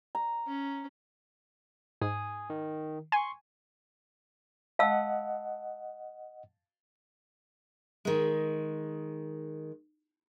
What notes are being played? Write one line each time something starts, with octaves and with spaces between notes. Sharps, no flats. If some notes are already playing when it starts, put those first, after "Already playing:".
A#5
C#4
G#2 G#5 D#6
D#3
G#5 C6 C#6
D#5 F5 F#5 A5 E6
D#3 G#3